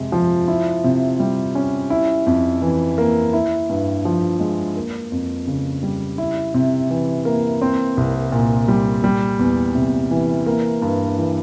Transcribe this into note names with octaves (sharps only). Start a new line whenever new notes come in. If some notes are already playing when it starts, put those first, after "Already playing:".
Already playing: F2 C3 G#3
F3
E4
C3
G3
C#4
E4
F2
E3
A#3
E4
G2
F3
G#3
A#3
F2
C#3
G3
E4
C3
E3
A#3
C4
C2
A#2
G3
G3
E2
C3
E3
A#3
G2
E3